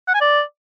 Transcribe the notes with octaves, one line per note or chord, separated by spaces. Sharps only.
F#5
G#5
D5